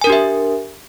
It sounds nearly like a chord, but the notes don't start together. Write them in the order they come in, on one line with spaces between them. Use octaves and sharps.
G#5 A#4 D4 G4 E5